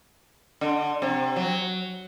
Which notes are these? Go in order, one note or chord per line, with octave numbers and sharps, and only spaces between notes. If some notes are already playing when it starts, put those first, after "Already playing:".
D3
C3
F#3